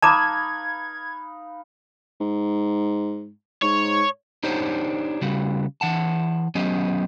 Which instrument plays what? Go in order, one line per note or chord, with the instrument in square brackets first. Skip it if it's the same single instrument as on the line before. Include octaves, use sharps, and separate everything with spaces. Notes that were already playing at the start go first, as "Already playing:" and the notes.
[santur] D#4 B4 F5 [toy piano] A5 A#5 D6 [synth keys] G#6
[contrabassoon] G#2
[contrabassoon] G#2 [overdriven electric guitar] C#5
[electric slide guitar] D4 D#4 G4 C5 C#5
C#3 G3 F#4
E3 F#5 A5
F#3 B3 C#4 G4 D#5